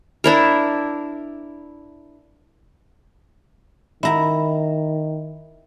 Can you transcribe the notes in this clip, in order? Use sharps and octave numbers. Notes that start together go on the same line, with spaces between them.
D4 E4 A#4
D#3 E4 A#5